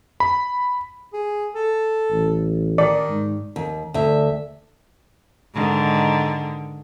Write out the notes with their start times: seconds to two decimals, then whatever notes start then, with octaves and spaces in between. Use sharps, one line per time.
0.20 B5
1.13 G#4
1.55 A4
2.10 A1
2.78 D#3 D5
3.09 G#2
3.56 D#2
3.94 D2 E5
5.54 G#2 D3 D#3